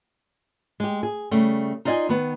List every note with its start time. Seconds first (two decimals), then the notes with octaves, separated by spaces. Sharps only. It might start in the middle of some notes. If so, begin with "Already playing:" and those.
0.80 G#3 G4
1.03 G#4
1.31 C#3 G3 A3
1.85 D#4 F4 D5 D#5 F5 G#5
2.09 D#3 B3